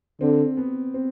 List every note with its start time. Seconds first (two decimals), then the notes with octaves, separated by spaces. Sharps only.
0.21 D3 C4
0.57 B3
0.94 C4